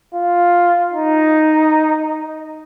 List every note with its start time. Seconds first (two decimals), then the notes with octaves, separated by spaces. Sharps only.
0.14 F4
0.93 D#4